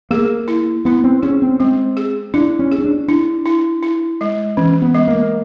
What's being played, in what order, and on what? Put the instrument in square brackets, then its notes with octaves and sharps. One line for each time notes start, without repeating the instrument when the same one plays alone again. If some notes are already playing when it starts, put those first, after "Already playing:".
[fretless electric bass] A#3 [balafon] G#4
[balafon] E4
[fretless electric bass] B3 [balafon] E4
[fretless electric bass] C4
[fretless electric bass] C#4 [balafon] G#4
[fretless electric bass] C4
[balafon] G#3 [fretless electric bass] C4
[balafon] G#4
[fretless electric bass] D4 [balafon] E4
[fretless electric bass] C#4
[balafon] G#4
[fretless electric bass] C#4
D4
[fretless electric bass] D4 [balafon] E4
[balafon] E4
E4
G#3
[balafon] E3 [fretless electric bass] C#4
[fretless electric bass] B3
[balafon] G#3
[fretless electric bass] A#3